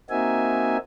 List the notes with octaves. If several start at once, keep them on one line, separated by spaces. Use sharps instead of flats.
A#3 C4 D#4 F#4 E5 G#5